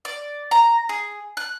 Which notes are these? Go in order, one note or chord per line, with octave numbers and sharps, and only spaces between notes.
D5
A#5
G#4
F#6